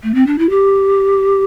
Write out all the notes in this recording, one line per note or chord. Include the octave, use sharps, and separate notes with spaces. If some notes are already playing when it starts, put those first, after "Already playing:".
A3
C4
D4
E4
G4